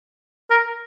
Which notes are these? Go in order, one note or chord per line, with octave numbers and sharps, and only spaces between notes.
A#4